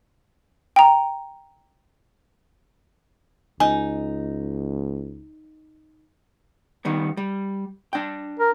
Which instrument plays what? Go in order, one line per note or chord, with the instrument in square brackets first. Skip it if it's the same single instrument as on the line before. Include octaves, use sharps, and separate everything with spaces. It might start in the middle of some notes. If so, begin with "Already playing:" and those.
[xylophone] G5 A#5
[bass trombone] C#2 [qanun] D#4 [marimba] G#5
[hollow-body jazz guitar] D#3 G3 B3
G3
D4 G5
[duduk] A#4